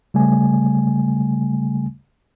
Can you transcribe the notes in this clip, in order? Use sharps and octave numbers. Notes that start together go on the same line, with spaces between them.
C#3 G3 A3 G#5